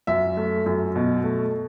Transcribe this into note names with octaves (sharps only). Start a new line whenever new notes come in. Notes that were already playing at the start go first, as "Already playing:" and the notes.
F#2 E5
A3
F#2
B2
A3